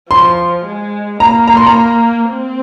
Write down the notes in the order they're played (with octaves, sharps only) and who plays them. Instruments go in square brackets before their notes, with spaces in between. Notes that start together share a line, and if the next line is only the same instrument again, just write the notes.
[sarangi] F3 [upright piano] C6
[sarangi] G#3
[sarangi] A#3 [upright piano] A#5
[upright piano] A#5
C6
A#5
[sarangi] C4